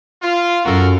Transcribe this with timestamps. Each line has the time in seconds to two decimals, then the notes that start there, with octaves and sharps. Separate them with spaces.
0.22 F4
0.65 F#2 F#4 A4 A#4